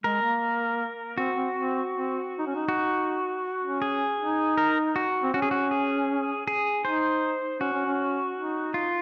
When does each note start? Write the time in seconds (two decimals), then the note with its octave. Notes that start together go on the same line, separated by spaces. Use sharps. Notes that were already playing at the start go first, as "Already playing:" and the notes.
0.04 G#3 A#4
0.22 A#3
1.17 C4 F#4
1.36 C4
1.55 C4
1.93 C4
2.39 D#4
2.47 C#4
2.55 D#4
2.69 F#4
3.63 C#4
3.82 G#4
4.20 D#4
4.58 A#4
4.96 F#4
5.23 C4
5.34 C#4 F#4
5.42 G#4
5.51 F#4
5.71 G#4
6.47 G#4
6.85 D#4 C5
7.60 C#4 F#4
7.73 C#4
7.86 C#4
8.36 D#4
8.74 F4